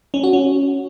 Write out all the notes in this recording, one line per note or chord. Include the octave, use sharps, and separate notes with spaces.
C#4
F#4
C#4